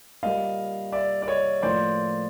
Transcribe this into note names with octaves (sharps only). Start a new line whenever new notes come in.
A#2 G3 A#3 D#5 F5
D5 E5
D5
C#5 D#5
A2 F3 A#3 C5 D5